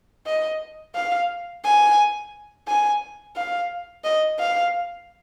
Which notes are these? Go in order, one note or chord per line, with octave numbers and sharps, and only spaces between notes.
D#5
F5
G#5
G#5
F5
D#5
F5